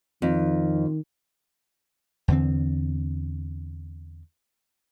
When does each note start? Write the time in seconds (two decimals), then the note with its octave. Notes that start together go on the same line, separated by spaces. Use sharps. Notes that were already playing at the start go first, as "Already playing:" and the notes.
0.22 F2 D#3
2.28 E2 D3 C4